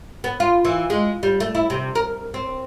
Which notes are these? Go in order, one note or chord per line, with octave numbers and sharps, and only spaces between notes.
B3
F4
E3
G#3
G3
A3
E4
C3
A#4
C4